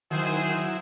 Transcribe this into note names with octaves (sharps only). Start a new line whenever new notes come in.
D#3 F#3 E4 G#4 C5